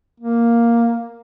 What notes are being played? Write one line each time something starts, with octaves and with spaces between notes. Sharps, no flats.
A#3